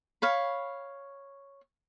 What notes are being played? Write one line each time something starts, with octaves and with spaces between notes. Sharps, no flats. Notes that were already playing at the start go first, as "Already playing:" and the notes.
C#5 F5 B5